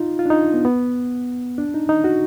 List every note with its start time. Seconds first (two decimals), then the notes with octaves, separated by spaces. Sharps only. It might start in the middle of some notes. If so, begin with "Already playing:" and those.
Already playing: D#4 F4
0.19 F4
0.26 D4
0.30 D#4
0.54 B3
0.65 B3
1.58 D4
1.74 D#4
1.89 D#4
2.04 F#4